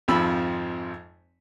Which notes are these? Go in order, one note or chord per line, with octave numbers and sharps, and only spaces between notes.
G#1 F2 F3 C4 B5 E6